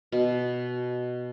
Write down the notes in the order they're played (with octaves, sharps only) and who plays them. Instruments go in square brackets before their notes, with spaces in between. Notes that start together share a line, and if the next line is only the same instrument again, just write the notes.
[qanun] B2